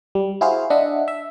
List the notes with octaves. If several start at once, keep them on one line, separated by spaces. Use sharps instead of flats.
G3
E4 F#4 G#4 C5 F5
D4 D#5 E5 F#5
E5